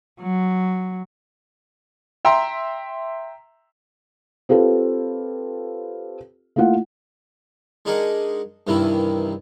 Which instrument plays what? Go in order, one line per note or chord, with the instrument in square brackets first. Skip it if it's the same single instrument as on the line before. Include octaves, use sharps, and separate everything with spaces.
[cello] F#3
[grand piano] E5 G5 A#5 C6
[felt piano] C4 F4 G4 A4 B4
A3 A#3 E4 F4 F#5
[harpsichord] G#3 D4 D#4 G#4 A#4 F#5
G2 C3 D#3 E3 A#3 E4